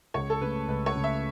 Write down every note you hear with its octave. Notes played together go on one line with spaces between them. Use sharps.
C#2 C#5
A4
C#3 A3 B4
C#2 B4
C#5
C#3 A3
E5